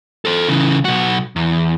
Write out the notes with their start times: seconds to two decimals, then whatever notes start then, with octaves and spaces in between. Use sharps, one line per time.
0.25 A4 C5
0.48 C#3 E3
0.85 B1 F#4
1.36 E2